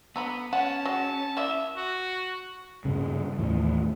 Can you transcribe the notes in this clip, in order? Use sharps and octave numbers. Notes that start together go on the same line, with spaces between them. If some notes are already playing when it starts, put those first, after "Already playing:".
D3 B3 A#5 B5
C#4 F#5 A5
F#3 G#3
A#3 E4 D5 E5
F#4
G2 C#3
D#2 A2 E3